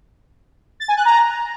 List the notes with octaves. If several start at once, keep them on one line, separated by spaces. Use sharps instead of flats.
A6
G#5
F#6
A#5